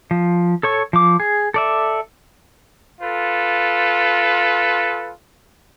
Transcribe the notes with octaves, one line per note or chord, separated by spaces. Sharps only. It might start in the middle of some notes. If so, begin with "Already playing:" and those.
F3
A4 C#5 C#6
F3 D6
G#4
A4 D5 E5
F4 A4 B4